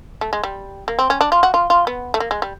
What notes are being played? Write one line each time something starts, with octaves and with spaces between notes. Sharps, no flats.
A3
G#3
G3
A#3
C4
C#4
D4
F4
F#4
F4
F4
B3
A3
A#3
G#3
G3